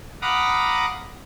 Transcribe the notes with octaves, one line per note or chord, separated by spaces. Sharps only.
F5 F#5 A#5 B5 D6 D#6